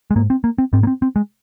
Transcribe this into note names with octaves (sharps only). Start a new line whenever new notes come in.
G#3
G#2 A#3
C4
A#3
C4
G#2 C4
A#3
C4
C4
G#3